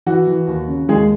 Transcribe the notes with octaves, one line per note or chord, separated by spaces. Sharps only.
E3 F#4
E3
D#2
C#3
D#2 G#3 G#4